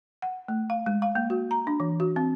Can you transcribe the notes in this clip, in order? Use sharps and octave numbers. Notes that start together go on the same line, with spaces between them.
F#5
A3
F5
G#3
F5
A#3
F#4
A#5
D4
E3
F#4
C4